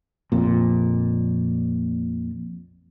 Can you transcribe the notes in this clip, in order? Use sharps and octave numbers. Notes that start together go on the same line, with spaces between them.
A#1 F2 A#2